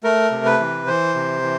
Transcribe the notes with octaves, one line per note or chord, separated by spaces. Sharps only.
A3 A#4
C3
B4
E3
E3 C5
C3
E3